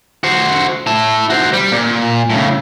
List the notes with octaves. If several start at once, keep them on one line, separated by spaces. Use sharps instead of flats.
F#4 C5
E4 A5
F#4 C5
G3
A#2
A2 C#3